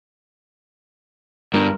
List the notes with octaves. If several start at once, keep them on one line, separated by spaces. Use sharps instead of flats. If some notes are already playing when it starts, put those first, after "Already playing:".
G1 G2 A#4